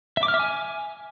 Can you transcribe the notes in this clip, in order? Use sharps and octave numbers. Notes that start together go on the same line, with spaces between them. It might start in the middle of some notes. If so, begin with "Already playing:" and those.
E5
D6
F6
E5
G#5